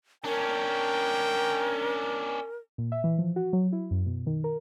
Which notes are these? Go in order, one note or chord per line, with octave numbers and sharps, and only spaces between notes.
C#4 D4 A#4 G5
A#2
E5
E3
F3
F#4
F#3
E4
F#2
B2
D#3
A#4